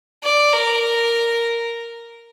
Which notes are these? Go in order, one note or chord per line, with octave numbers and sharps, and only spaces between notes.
D5
A#4